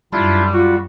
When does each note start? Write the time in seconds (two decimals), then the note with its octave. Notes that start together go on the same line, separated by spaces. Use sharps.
0.13 F#2 G3 D4 E4 F4
0.54 F4 F#4